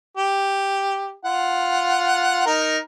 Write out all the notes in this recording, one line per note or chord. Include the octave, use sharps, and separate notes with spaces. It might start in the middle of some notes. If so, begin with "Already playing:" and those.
G4
F4 F#5
D#4 A#4